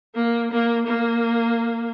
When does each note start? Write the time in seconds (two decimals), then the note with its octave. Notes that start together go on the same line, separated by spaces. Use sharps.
0.15 A#3
0.51 A#3
0.87 A#3